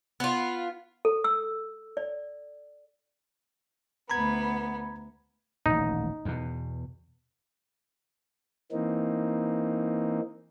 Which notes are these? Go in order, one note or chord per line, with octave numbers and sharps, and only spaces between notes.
B3 F4
A4
E6
D5
D2 B3 A#5 B5 G#6
D#1 A1 D#4
E2 B2
E3 A#3 C4 D#4